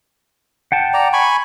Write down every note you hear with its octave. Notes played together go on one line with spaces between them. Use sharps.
F#5 G5 A5
D5 A#5
G#5 B5 C#6